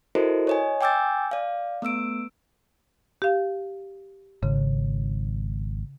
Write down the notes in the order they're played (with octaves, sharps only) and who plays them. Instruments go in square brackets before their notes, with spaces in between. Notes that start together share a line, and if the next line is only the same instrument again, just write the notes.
[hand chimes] E4 F#4 A4 A#4 C5 D#5
C#5 D#5 G#5
G5 G#5 D6 E6 G6 A6
D5 F5
A3 B3 E6 D7
[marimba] G4 F5
[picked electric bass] G#1 [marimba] C#3